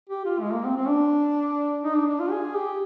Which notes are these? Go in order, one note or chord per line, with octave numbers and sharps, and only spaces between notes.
G4
F4
G#3
A#3
C4
C4
D4
D#4
D4
D4
F4
G#4
G4